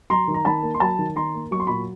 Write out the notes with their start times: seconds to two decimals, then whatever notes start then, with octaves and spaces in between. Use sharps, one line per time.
0.10 F#3 A#5 C6
0.28 D#3
0.34 A#5
0.45 D#3 A5 B5
0.63 A#3
0.74 C6
0.80 F#3 A5 B5
0.99 D#3
1.16 D#3 A#5 C6
1.34 A#3
1.51 F#3 C#6
1.60 C6
1.67 A#2 B5 C#6